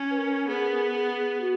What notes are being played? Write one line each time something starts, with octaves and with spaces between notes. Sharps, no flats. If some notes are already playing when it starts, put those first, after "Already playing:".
Already playing: C#4
B4
A#4
B3 G#4
F#4